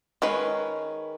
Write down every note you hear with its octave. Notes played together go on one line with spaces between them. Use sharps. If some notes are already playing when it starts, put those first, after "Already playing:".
D#3 G#3 C#4 B4